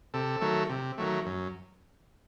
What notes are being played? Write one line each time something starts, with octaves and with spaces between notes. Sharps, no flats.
C3 A4
D#3 F#3 A3
C3
D#3 F#3 A3
F#2